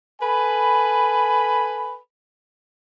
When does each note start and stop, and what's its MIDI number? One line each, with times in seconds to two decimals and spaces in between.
0.21 1.98 69
0.21 1.98 71
0.21 1.98 80
0.21 1.98 83